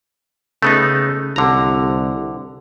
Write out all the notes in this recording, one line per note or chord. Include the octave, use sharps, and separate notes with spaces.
C#3 A3 B3 D#4
C2 D3 A#5